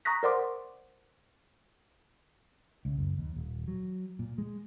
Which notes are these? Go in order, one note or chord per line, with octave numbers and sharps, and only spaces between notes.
A#5 C#6 D#6 F#6 A#6 B6
A#4 C5 D5 F#5 C6 D6
C#2
F#1
D#2
D#1
F#3
A#2
G#3